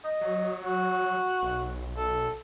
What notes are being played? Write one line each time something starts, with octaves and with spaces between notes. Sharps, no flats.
D#5
F#3
F#4
B1
A4